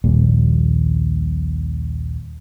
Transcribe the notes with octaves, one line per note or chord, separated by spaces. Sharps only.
A#1 D#2 A#2 G3